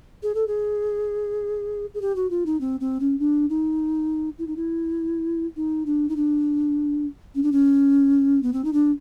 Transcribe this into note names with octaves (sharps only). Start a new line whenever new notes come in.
G#4
A4
G#4
G#4
G4
F#4
F4
D#4
C4
C4
C#4
D4
D#4
E4
D#4
E4
D#4
D4
D#4
D4
C#4
D4
C#4
B3
C4
D#4
D4